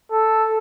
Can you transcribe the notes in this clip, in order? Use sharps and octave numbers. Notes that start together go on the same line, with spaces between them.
A4